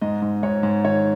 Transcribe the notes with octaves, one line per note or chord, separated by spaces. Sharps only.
G#2 D#5
G#2
G#2 C#5
G#2
D#3 C#5